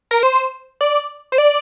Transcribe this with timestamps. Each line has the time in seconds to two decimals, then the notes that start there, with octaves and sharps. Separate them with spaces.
0.11 A#4
0.23 C5
0.81 D5
1.32 C5
1.38 D5